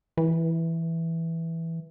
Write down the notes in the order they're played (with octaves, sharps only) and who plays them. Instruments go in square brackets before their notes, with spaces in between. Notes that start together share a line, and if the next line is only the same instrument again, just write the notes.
[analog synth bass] E3